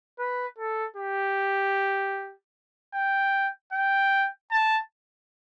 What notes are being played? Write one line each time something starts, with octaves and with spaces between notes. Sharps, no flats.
B4
A4
G4
G5
G5
A5